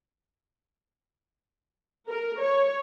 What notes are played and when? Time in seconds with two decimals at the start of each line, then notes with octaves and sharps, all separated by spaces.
2.08 A#4
2.41 C#5